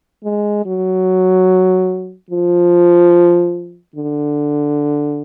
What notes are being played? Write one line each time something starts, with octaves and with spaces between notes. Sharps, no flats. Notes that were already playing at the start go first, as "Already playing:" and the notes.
G#3
F#3
F3
D3